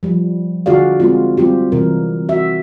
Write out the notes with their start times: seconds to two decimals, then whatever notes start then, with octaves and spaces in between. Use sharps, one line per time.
0.03 F3 G3
0.66 D3 F4 F#4 G#4 D5 F5
1.00 G#3 C4 F4
1.37 G3 C4 F4 G4
1.72 C3 E3 G3 A#4
2.29 F#4 E5